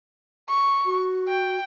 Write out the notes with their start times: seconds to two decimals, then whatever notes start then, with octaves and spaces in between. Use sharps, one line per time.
0.49 C#6
0.85 F#4
1.28 G5